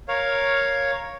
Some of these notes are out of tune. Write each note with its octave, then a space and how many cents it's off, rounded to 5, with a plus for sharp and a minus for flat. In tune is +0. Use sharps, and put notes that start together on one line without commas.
A#4 +0 C#5 +0 F5 +5